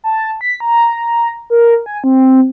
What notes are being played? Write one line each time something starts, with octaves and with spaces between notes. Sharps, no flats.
A5
B6
A#5
A#4
G#5
C4